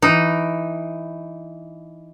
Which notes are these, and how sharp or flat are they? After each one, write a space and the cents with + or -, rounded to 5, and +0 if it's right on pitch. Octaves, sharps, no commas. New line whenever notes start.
E3 +5 D#4 +0